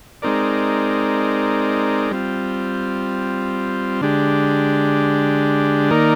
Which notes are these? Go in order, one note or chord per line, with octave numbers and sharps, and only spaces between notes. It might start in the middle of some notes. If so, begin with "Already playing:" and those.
G#3 C4 D#4 A#4 D5
G3 C4 F4
D3 G#3 D4 G4
D#3 A#3 D#4 A#4 D5